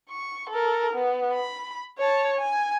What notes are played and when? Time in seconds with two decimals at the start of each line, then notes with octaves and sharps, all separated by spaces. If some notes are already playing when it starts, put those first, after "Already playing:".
0.10 C#6
0.50 A4 A#4
0.94 B3
1.33 B5
1.98 C#5 A5
2.37 G#5